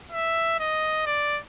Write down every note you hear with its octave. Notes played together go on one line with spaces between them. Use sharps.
E5
D#5
D5